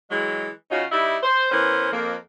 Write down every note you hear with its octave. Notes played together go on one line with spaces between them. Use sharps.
E3 F#3 G#3
C#3 C#4 D#4 F4 F#4
G3 D#4 E4
C5
E3 B3 C#4 A#4 C5
F2 A#3